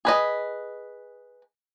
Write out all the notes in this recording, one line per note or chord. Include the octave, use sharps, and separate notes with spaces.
G#4 B4 D#5